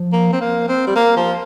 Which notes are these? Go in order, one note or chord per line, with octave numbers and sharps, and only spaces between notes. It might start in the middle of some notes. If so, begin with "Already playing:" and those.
Already playing: F3
A#3
C4
A#3
C4
G3
A#3
F3